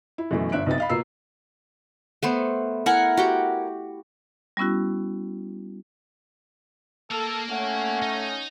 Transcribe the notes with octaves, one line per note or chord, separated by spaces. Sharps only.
E4
F#2 B2 E3 A3
G1 D4 E5 F#6 D7
B1 C3 B3 E5 A6
D#5 F5 B5
B2 A#3 F4 B4 E6 C7
A3 B3 C5
E4 A#4 F#5 G#5
F#4 G4 G5
G3 B3 C#4 E4 F#4
A#3 A4 F5
A3 C#4 F#5
D#4